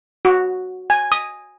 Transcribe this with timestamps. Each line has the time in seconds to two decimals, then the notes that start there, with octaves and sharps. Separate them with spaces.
0.25 F#4
0.90 G#5
1.12 D#6